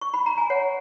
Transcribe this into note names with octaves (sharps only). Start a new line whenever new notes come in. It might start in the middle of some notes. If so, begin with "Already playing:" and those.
C#6
B5
A#5
G#5
C#5 F#5